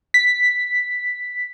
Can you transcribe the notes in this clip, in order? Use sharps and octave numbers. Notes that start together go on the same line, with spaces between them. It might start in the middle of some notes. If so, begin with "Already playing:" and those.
B6